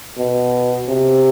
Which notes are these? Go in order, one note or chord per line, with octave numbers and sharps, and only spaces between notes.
B2
C3